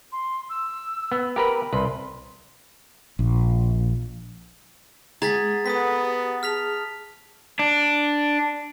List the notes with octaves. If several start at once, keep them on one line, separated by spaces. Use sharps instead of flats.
C6
E6
B3
G4 A#4 B4 B5
C2 B4 C6
A#1
G#3 G#4 F#5 A#5 A6 B6
B3 A4 D#6 B6
G4
G#4 A5 F6 B6 F7
D4